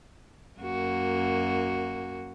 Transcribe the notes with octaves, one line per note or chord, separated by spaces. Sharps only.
F#2 A#3 F#4